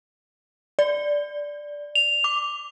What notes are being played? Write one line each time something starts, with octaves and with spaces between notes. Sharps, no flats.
D5
F7
D6